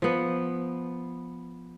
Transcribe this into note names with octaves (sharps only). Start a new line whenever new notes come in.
F3 B3